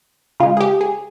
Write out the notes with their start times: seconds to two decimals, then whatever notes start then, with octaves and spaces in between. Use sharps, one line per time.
0.40 C#3 G#3 F4
0.57 G#4
0.60 G4
0.81 G#4